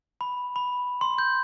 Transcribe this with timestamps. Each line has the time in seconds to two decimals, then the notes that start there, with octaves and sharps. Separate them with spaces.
0.21 B5
0.56 B5
1.01 C6
1.18 G6